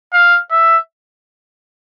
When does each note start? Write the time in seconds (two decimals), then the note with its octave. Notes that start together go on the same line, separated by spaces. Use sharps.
0.13 F5
0.51 E5